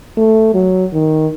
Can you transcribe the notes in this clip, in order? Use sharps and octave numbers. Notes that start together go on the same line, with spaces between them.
A3
F#3
D#3